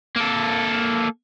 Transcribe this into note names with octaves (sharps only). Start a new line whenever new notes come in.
A#3 A4